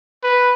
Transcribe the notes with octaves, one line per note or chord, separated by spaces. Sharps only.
B4